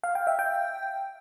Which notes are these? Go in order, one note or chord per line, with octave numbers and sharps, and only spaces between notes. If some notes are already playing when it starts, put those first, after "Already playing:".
F5
G5
E5
G5